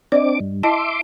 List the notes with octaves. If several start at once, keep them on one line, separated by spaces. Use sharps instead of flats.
C4 D4 D5 D#5 D6
G2
E4 D#5 E5 A5 C6 D6